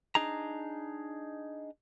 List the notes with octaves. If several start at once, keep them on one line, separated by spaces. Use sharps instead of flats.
D4 D#4 G#4 A#5